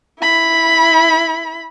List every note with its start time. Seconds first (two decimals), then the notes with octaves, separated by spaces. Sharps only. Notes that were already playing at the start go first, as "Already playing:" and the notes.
0.21 E4 B5